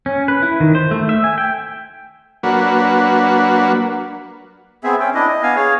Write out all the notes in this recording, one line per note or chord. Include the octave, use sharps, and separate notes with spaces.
C#4
B4
E4
D#3
C5
A3
E5
G#5
G5
F#3 A#3 D4 F#4 B4
B3 C4 G#4 E5
C#4 G5
D4 E4 D#5
D#5
B3 F5 G#5
G#4 C#5 F5